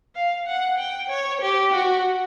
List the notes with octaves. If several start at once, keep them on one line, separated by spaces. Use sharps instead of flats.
F5
F#5
G5
C#5
G4
F#4